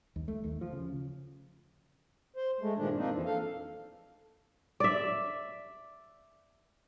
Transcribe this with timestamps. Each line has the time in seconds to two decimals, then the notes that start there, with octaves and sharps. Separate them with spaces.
0.16 D#2
0.28 A3
0.44 D#2
0.61 F3
0.73 C#3
2.36 C5
2.61 G#3 A3
2.77 G2 A#2 D#3 F3 G#3 D4
2.97 F3 A#3 C4 D4 D#4
3.11 F2 E3 F3
3.26 A4 F5
4.80 D5 E5